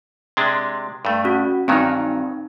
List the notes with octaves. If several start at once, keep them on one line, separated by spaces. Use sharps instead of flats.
C3 G#3 D4
G2 A3
C#4 F#4
G2 D#3 F#3 C4 D#4